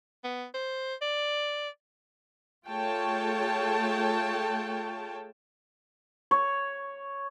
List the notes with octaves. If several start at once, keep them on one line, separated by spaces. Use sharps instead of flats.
B3
C5
D5
A3 F4 G#4 C#5 G5 A5
C#5